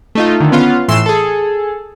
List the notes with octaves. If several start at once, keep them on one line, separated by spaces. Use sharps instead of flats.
A3 D#4 F4
D3 D#3
B3 C#4 F4
A2 E3 C6 E6 E7
G#4 A4